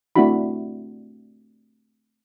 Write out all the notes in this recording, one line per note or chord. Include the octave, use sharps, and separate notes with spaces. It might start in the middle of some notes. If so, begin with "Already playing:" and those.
A3 C4 D4 E4 F#4 B5